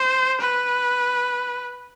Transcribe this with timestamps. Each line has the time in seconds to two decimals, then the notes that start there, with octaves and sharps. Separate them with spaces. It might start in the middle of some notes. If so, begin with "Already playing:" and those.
Already playing: C5
0.41 B4